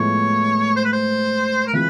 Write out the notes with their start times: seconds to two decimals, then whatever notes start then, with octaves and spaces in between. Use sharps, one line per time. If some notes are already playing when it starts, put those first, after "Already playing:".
Already playing: A2 F3 G#3 B3 E4 C#5
0.76 C5
0.85 B4
0.93 C5
1.67 A#4
1.73 E3 G#3 C4 F4 B4